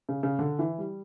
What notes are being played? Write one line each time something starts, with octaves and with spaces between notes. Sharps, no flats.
C#3
C#3
D3
E3
G3